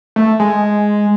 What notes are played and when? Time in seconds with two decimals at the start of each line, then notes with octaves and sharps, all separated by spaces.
0.16 A3
0.40 G#3